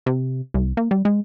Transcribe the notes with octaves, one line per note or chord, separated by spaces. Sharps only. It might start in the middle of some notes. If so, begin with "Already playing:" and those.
C3
C2
A#3
G3
G#3